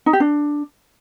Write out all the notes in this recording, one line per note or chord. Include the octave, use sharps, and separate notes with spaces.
D#4
G4
D4